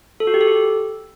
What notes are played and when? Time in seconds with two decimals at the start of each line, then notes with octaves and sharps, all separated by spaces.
0.20 A4
0.27 F#4
0.34 G4
0.41 A4
0.48 G4